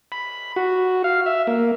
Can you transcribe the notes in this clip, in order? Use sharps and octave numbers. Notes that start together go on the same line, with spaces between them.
B5
F#4
F5
E5
A#3